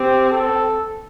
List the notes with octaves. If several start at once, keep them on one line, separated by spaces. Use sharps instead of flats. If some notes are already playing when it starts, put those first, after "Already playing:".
Already playing: C4 G4
A4